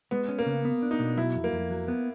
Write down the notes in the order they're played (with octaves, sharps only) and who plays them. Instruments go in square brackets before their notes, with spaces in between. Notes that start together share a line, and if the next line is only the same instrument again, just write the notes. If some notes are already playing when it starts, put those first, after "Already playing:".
[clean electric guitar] G#3 [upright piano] B3
[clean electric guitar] C#4
[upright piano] A#3
[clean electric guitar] C#3
B3
D4
[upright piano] D#4
[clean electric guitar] B2
[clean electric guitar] F#3 [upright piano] E4
[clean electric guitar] F2
[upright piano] A#3
[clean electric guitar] F2
F#3
B3